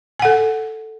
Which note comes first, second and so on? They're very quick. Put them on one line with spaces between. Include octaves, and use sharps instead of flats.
G#5 F#5 A4